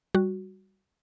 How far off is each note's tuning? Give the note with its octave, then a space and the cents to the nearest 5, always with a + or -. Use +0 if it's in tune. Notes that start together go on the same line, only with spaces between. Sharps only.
G3 -5 F#4 +0